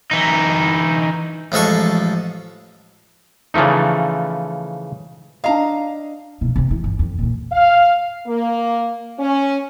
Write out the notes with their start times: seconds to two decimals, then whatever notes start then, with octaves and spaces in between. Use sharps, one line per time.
0.11 E3 D#4
1.52 A1 F3 G#3 A4 C#6
3.54 C#3 E3 F3 A3 D#4
5.44 D4 D#5 F5 A#5
6.41 B2 F3
6.56 F#2 C3
6.69 E2 E3
6.84 G1
6.99 F2
7.19 A#2 A#3
7.53 F5
8.28 A#3
9.19 C#4